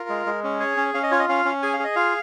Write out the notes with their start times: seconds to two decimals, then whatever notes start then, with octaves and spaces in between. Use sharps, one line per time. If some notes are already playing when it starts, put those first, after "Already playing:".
Already playing: F4 A#4
0.09 G#3
0.26 G#3
0.44 C#4
0.60 G#4 C#5
0.77 C#4
0.94 C#4 F5
1.03 D#5
1.11 F4 C#5
1.19 D#5
1.29 C#4 F5
1.45 C#4
1.62 G#4 G#5
1.73 F5
1.79 G#4 D#5
1.96 F4 F5